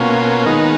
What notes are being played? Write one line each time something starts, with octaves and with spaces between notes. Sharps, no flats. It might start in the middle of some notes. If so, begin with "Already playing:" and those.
Already playing: B2 A#3 C#4 F4
D#3 G#3 B3 D#4